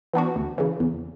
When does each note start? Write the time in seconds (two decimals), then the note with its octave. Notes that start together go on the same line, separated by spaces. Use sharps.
0.13 E3 B3 D4 F#4
0.36 D2
0.58 C#3 E3
0.80 E2